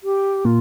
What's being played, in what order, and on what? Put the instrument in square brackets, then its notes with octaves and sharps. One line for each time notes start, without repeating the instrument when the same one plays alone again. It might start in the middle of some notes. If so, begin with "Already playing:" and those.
[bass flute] G4
[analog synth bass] A#2 [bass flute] F4